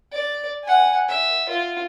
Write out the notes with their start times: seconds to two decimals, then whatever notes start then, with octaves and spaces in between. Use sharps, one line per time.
0.12 D5
0.64 F#5 G#5
1.09 E5
1.49 F4